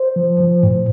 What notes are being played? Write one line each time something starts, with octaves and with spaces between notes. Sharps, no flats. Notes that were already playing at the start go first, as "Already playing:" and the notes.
Already playing: C5
F3
F3
A2